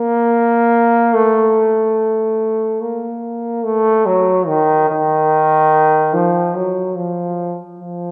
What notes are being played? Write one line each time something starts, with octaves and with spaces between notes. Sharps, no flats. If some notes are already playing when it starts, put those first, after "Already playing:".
Already playing: A#3
A3
A#3
A3
F#3
D#3
D#3
F3
F#3
F3
F3